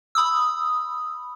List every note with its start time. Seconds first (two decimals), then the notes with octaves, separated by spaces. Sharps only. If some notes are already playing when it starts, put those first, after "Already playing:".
0.15 B5 D#6 E6